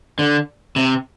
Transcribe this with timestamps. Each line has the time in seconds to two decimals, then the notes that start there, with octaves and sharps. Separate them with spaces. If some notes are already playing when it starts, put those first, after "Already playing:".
0.19 D3
0.76 C3